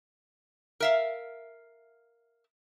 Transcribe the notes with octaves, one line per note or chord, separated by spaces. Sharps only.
A#4 E5 F5